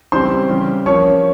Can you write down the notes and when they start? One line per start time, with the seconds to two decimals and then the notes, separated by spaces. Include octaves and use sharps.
0.12 C#3 E3 G3 C4 C5 C6
0.49 C#3 E3 G3
0.86 F3 A#3 C#4 C#5 C#6